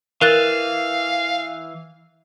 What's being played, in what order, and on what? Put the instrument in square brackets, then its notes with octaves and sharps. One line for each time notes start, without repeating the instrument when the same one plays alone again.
[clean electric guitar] E3 [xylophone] A#4 F#6 A6 [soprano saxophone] F5